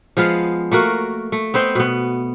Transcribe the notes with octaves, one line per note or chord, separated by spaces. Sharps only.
F3 G#3 B3 F5
A3 A#3 F#4 A#4
A3
B3 C4 C5 D#5
B2 B3